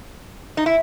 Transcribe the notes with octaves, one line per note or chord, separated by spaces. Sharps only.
D#4
E4